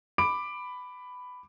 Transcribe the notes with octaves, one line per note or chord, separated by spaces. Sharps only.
B5 D6 D7